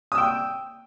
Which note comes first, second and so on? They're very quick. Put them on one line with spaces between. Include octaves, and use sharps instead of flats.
D#6 E6 G5